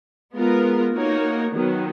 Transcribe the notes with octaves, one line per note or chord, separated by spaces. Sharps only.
G#3 B3 F4 A#4
A#3 D#4 F#4 A#4 C#5
D#3 F#3 B3